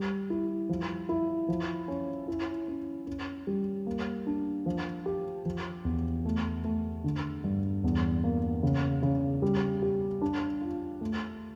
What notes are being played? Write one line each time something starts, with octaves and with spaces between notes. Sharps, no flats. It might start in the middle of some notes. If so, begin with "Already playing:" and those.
Already playing: G3
E4
F3
E4
F3
C#4
E4
C#4
C#4
G3
A#3
D4
F3
G4
F3
E2
A3
A3
D3
G2
E2
A#3
C#3
C#3
G3
G4
D4
F4
A3